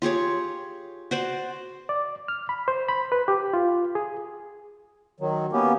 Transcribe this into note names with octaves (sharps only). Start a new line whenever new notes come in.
F4 G4 G#4 C#5
F#4 C5 D5
D5
F6
B5
C5
B5
B4
G4
F4
G#4
D#3 F#3
A#3 B3 C#4 G4